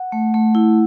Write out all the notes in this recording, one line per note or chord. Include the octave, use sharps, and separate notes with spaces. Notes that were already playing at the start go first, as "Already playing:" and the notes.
Already playing: F#5
A3
A3
E4